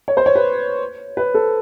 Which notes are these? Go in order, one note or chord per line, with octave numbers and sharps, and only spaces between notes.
C#5
C5
C#5
B4
B4
A4